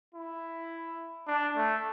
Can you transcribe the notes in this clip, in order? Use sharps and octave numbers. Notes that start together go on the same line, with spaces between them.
E4
D4
A3